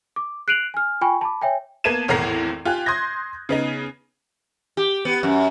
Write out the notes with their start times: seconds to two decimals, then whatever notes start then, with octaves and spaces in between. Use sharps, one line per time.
0.16 D6
0.48 F#6 C7 D7 D#7 F7 F#7
0.74 G#5 F6
1.01 F4 G5 G#5 B5 C#6
1.21 A5 B5 D6
1.42 C#5 E5 G5 G#5
1.84 A#3 B3 A5 G#6 D#7 E7
2.08 G#1 E2 A2 A#4 C7
2.65 F4 G4 G#5 F#6
2.86 C6 D#6 G6 G#6 A#6
3.49 C#3 B3 D#4
4.77 G4
5.05 B3
5.23 F#2